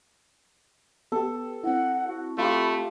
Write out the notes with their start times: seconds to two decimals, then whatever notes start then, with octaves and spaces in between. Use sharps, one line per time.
1.12 B3 G4 A4
1.64 C4 E4 F#5
2.07 F#4
2.38 A3 F4 G4 B5